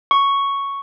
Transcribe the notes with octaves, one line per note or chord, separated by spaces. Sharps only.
C#6